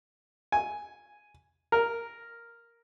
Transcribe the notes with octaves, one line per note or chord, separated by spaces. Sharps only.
G#5
A#4